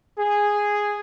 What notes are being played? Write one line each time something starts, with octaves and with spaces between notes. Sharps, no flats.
G#4